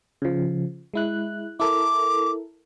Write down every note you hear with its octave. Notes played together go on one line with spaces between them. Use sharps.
C#3 F3
G#3 E4 F#6
E4 A4 A#4 D6